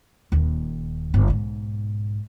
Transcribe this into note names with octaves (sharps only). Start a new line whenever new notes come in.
D#1 D#2
G1
B1 G#2